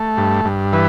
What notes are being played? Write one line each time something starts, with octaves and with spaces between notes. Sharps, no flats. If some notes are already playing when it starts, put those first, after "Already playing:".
Already playing: A3
G2
G2
E3 B4